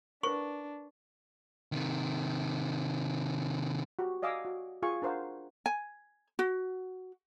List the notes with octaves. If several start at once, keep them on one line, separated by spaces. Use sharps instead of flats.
D4 A#4 B4 C#6
C3 D#3
F#4 G4
D5 D#5 F5 G#5 D6 E6
F#4
F4 G#4 F5 G#5 C#6
D4 A#4 C5 F5 F#5
G#5
F#4